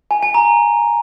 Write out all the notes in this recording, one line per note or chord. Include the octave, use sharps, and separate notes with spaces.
G#5
G#5
A#5